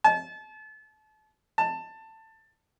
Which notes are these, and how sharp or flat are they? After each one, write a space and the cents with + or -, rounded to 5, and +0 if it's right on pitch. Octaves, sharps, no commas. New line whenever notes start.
A5 -35
A5 +15